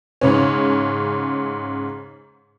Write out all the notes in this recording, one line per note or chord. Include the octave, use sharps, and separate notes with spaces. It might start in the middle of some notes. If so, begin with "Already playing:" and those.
G#2 C#3 C#4